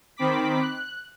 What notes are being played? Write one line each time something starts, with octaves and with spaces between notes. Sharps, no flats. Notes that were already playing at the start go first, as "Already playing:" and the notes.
D#3 C4 B5 D6 B6
F#6